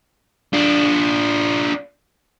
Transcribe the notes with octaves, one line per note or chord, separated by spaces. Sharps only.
D4 F4